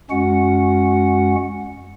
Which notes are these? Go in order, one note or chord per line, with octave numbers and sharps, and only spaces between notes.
F#2 G#3 C#4 F#4 F#5